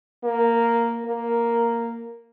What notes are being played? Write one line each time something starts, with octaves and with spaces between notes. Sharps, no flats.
A#3
A#3